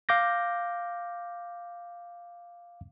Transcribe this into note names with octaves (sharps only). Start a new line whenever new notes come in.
F5 D6 G6 A#6